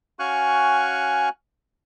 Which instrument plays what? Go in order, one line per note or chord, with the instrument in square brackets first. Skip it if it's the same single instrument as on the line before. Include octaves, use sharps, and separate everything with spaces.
[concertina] C#4 F#4 F5 G#5 C#6 F#6